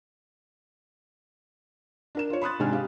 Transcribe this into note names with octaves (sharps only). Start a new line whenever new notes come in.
D4 A#4 E7
F4 C#5
B5 C6 D#6 F#6 A6
G#2 C3 D4 D#4 G#5 F6
G4 F5